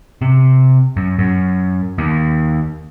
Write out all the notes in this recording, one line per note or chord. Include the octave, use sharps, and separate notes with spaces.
C3
F#2
F#2
D#2